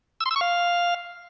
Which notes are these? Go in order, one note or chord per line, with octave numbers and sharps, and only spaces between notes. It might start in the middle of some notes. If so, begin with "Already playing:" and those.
E6
C6
E6
C#6
F5